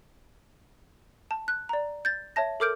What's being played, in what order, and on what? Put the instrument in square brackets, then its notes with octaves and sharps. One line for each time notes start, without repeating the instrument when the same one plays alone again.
[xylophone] A5
F#6
D5 A#5
G6 A6
C#5 E5 A5 A#6
A4 A#4 D6 F6 G6 D7